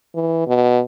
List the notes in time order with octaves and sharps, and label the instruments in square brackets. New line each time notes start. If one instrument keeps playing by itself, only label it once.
[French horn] E3
B2